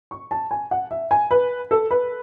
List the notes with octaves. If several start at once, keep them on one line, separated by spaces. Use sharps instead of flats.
C#6
A5
G#5
F#5
E5
G#5
B4
A4
B4